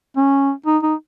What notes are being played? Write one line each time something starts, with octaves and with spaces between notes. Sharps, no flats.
C#4
D#4
D#4